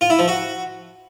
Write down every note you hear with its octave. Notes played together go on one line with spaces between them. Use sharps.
F4
E4
F3
F#4